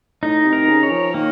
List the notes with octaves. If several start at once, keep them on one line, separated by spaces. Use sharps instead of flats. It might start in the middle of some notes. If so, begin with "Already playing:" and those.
A2 D#4
C3
A#4
C#3
C#5
F3
D#3 A#3